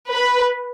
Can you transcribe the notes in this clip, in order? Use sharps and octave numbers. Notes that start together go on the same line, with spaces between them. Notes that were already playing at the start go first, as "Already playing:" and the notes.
B4